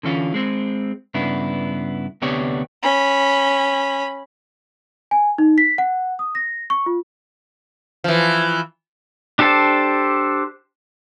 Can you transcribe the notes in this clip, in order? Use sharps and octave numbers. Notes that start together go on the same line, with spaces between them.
D3 E3 C#4 F4
G#3 C4
G2 C#3 B3 D4 E4
D2 C3 B3 D4 G4 C#5
C#4 B5
G#5
D#4
B6
F#5
D#6
A#6
C#6
F4
E3 F3
D4 G4 A4 C5 A5